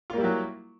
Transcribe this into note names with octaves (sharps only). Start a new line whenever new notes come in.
F#3 G3 A#3 E4 F4